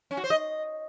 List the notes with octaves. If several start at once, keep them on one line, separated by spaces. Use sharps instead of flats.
C#4
F#4
C5
D#5